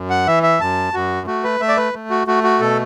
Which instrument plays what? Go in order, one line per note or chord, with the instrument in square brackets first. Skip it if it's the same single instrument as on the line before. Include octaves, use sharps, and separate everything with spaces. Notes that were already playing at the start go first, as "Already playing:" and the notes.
Already playing: [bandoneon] F#2
F#5
E3 E5
E5
F#2 A5
F#2 F#4
A3 F#4
B4
A3 E5
D5
B4
A3
F#4
A3 F#4
F#4
B2 A4